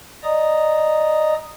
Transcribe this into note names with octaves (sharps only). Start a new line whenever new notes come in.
D5 D#5 A#5 D#6